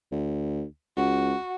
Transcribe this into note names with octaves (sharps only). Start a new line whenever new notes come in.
D2
C#2 F#4